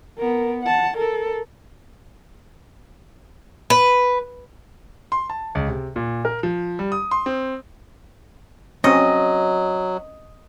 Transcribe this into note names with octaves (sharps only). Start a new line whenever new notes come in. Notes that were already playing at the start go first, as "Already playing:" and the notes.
B3 A#4
F#5 A5
A4 A#4
B4
C6
A5
C#2
C3
A#2
A#4
F3
G3
D#6
C6
C4
F#3 C4 C#4 D#5